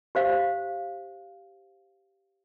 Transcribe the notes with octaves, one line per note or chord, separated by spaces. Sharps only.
G4 C5 F5